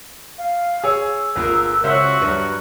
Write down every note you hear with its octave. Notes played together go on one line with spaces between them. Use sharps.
F5
G#4 C#5 E6
G1 A#3 F4 G#4 A#4
C#2 C#3 C#4 F#4 C5 E5 F#5
G2 F#3 B4